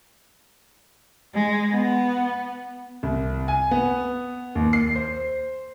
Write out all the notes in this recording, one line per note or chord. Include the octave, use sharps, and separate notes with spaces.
G#3
B3
C2
G#5
B3
D#2
C7
C5